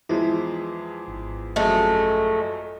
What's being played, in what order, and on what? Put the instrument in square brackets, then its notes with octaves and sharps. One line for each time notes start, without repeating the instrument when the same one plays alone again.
[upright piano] E2 F3 G#3 [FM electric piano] E4
[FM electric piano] G#1
[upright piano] A#1 F#2 [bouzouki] G#3 A3